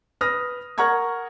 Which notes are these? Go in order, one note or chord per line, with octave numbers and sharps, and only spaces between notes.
B4 D#6 F6 A#6
A#4 F#5 A#5 C#6 G#6